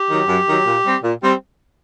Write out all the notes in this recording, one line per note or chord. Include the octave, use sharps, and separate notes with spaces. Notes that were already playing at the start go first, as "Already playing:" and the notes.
Already playing: G4
D#3 F#3
F#2
D#3 F#3
A#2
G3 C4
A#2
G3 C4